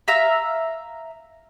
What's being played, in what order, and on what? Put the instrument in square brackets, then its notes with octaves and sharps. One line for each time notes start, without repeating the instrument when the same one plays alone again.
[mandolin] E5 F5 A#5 E6